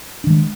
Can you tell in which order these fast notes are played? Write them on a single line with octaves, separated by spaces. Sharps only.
D4 D#3 G#3